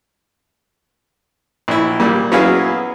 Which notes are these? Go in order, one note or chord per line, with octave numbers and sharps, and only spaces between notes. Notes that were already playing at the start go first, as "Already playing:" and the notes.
A#1 E4
A#2 G3
F#3 B3 C#4 E4 G#4 F5